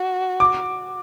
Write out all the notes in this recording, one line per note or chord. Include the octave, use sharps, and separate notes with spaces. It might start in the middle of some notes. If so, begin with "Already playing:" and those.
Already playing: F#4
D6